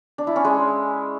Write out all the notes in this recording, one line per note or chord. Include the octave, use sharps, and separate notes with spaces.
D4
E4
C#4
G#3